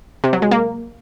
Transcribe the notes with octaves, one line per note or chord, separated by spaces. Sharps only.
C3
F#3
G#3
A#3